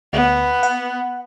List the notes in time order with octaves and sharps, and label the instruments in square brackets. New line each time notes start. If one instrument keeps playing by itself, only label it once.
[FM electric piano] D2 [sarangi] B3
[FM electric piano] F#5